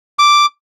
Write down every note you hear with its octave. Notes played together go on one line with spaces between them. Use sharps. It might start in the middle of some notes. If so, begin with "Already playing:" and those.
D6